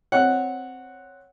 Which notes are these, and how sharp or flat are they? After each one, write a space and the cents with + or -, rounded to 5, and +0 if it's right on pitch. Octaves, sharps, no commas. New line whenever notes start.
C4 +0 C#5 +0 F#5 +0